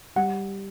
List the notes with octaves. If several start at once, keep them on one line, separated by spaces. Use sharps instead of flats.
G3 F#5